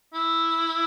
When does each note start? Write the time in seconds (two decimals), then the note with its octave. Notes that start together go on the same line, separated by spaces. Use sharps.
0.14 E4